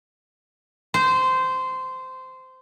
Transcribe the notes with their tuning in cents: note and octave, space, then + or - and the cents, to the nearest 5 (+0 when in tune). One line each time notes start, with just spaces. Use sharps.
C5 -15